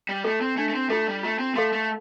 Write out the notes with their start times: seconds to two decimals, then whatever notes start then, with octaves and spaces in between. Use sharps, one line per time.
0.09 G3
0.24 A3 F4 A4
0.41 C4
0.57 A3 D4
0.69 A3
0.74 C4
0.89 A3 F4 A4
1.07 G3
1.23 A3 F4
1.39 C4
1.55 A3 A4 F5 C6
1.72 A3